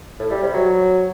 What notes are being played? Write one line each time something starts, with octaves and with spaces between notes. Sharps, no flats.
A2
G3
C3
F#3